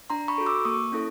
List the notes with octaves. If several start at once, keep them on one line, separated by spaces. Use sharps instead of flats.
D4 A#5 C6
B5 C#6
F#4 A4
D6 E6
A#3 C#6 D#6
C#4 E4 A4